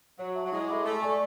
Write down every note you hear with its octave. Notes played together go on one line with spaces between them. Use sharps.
F#3 C#5
E5 A5 C#6
F#3
G#3 E4
A4 E5 B5 D6
A3 A4
D5 G#5 C#6